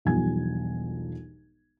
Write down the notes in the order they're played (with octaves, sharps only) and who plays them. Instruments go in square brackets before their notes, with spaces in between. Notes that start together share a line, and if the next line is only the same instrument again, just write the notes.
[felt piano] E1 B1 F3 G3 G#5 G#6